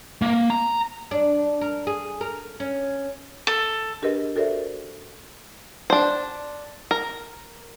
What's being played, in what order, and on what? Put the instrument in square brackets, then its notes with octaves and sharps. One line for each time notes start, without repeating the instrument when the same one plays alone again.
[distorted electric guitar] A#3
A#5
[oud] D4
A#4
G#4
A#4
C#4
[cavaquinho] A4
[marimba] D4 G4 G#4 A#4 B4 D#5
F#4 A4 A#4 C5 D5 E5
[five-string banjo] D4 C5
A#4